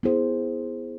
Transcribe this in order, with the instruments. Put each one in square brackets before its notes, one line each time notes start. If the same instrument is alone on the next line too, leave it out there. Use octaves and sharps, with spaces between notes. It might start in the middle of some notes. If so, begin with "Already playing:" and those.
[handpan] B3 E4 G#4 C5